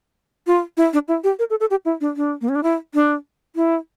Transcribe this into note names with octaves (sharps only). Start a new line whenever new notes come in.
F4
E4
D4
E4
G4
A#4
A4
A4
G4
E4
D4
D4
A#3
C#4
D4
E4
D4
E4